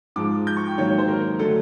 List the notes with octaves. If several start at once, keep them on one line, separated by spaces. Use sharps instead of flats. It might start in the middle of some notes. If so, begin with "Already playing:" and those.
G#2 F3 G#3 D6
G6
C#6
G5
G#2 D#3 F#3 A#3 C#5
C#5
C5
A#4
D3 F#3 A3 A4